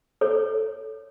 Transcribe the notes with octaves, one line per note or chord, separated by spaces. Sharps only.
A4 C#5